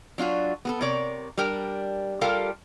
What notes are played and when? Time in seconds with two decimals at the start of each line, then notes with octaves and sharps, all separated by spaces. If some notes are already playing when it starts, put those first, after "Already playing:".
0.18 F#3 D4 F4 F#4
0.65 B3 G#4 A4
0.81 C3 A#4 C#5 D5
1.37 G3 D4 A#4 G5
2.21 G3 F4 G4 A4 A#4 F5